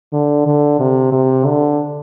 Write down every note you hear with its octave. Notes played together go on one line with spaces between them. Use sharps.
D3
D3
C3
C3
D3